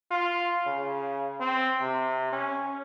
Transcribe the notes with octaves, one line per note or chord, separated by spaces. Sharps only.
F4
C#3
C4
C3
C#4